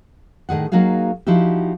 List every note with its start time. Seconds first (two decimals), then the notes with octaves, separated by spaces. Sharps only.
0.49 A2 D#3 G#4 F#5
0.72 F#3 A#3 D#4 F#4 G#4 F5
1.27 F3 D#4 E4 F#4 G4